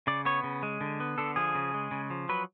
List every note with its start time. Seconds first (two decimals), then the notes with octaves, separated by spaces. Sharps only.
0.07 C#3 D5
0.25 B3 C#5
0.44 C#3
0.63 G#3
0.81 D3
1.00 B3
1.18 D3 A4
1.36 F3 G#4
1.55 C#3
1.74 G#3
1.91 C#3
2.10 F3
2.29 F#3 B4